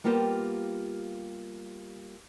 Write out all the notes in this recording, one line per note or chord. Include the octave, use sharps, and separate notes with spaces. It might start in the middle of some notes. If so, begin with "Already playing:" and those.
G3 A#3 B3 F4 G4 C5